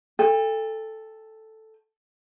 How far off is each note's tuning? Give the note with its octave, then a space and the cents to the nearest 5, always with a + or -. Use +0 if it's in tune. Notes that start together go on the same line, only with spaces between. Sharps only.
A4 +0 G5 +40